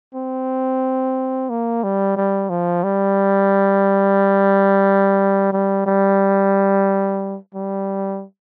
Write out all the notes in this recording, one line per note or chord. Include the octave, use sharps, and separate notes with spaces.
C4
A#3
G3
G3
F3
G3
G3
G3
G3